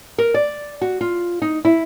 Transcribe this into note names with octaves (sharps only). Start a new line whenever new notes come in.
A#4
D5
F#4
F4
D#4
E4